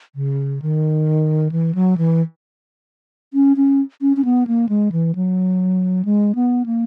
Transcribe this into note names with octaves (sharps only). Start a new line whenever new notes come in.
C#3
D#3
E3
F#3
E3
C#4
C#4
C#4
C#4
B3
A#3
G#3
E3
F#3
G#3
B3
A#3